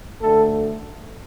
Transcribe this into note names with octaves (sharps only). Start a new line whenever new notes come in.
D2 D3 A3 A4